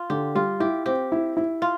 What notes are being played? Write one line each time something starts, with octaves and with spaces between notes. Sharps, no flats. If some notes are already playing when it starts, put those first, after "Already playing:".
Already playing: F4
D3 G4
G3 F4
E4 G4
C4 G4
E4
E4
F4